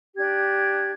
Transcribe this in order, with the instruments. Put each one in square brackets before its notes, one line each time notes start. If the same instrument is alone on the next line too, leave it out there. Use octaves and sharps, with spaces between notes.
[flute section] D4 G4 G#6